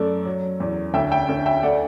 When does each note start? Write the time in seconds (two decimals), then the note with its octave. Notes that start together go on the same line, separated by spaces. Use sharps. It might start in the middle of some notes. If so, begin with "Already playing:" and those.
Already playing: F#2 A3 D5
0.25 F#3
0.60 E2
0.94 D2 E5 G5
1.11 E5 G5
1.29 D2
1.46 E5 G5
1.63 A3 D5 F#5